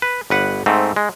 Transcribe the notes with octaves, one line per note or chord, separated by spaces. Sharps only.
B4
G1 B4 F#5
G#2 A3 C4
G#3